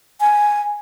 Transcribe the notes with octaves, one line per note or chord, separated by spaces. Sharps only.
G#5